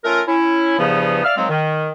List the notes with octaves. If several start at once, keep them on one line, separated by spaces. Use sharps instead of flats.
A3 C#4 F4 A#4
C#4 E4
E2 G2 C#3 F3 B3
D5 E5 F5 F6
D#3 F3 F#3 G#3 C4
D#3